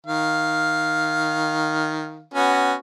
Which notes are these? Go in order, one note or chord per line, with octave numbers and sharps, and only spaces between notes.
D#3 F5
B3 C#4 F#4